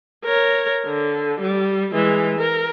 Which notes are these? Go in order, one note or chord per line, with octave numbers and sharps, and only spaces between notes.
A#4 C#5
D3
G3
E3 G#3
A#4